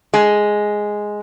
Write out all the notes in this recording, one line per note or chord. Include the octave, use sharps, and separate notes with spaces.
G#3